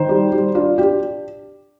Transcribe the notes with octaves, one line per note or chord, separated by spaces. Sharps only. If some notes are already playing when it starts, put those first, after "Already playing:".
Already playing: D#3 C5
G3
G3
D4 F4
D4 G4